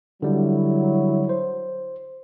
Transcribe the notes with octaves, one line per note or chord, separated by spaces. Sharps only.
D3 F#3 G3 E4
C5